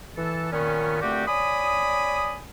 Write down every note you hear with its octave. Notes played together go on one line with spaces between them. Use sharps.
E3 A4
A#2 D#3 B3 C#4
A#2 D3 A3 C4 F#4 G4
C#5 D5 G#5 B5 D#6